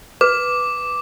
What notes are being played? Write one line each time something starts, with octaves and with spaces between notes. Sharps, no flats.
B4 D6